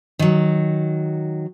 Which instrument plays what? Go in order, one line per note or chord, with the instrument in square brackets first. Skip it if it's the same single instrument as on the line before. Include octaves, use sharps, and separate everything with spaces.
[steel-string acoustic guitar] D#3 F#3